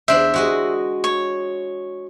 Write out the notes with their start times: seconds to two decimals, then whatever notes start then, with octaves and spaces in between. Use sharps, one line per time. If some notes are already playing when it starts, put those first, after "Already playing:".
0.08 E2 D4 C5 E5
0.34 G#3 F#4 D#5
1.04 C#5